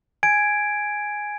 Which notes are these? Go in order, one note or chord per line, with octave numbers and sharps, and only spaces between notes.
G#5 G#6 D7